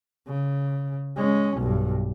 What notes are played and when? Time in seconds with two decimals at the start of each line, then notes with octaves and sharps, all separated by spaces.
0.28 C#3
1.16 G#3 C#4
1.57 B1 G2